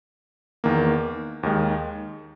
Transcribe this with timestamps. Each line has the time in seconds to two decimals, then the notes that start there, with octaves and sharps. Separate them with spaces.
0.64 E2 D#3 A#3
1.43 D#2 D#3 G#3